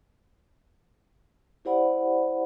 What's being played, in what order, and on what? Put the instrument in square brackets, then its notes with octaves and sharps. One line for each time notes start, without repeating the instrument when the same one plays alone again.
[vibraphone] E4 G4 C5 D5 F#5 B5